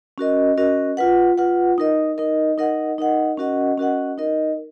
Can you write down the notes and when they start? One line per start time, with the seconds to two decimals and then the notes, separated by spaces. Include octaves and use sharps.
0.18 C#4 F#4 A#4 D#5
0.57 C#4 F#4 A#4 D#5
0.97 F4 B4 F#5
1.38 F4 B4 F#5
1.78 D#4 A#4 D#5
2.18 D#4 A#4 D#5
2.58 D#4 A#4 D#5 F#5
2.98 D#4 A#4 D#5 F#5
3.37 C#4 F#4 A#4 D#5 F#5
3.78 C#4 F#4 A#4 D#5 F#5
4.18 D#4 A#4 D#5